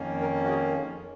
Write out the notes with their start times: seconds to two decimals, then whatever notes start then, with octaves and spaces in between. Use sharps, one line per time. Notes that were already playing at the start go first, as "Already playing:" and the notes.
Already playing: F2 D#3 A#3 C#4
0.21 A#4
0.45 F#4
0.49 G#4